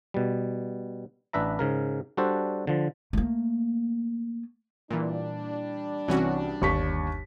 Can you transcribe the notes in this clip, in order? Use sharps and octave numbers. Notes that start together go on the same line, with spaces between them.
B2 G3
A1 D4 B4 E5 A#5
G#2 C#3 A#4
G3 D4 F#4 A4 C5
D3 F3
A3 A#3
A#2 E3 G3 D4
C2 E3 C#4 F#4
G1 D#2 C#6 B6